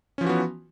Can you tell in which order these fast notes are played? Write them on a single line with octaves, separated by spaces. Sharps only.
C#4 F3 E3 F#4 B3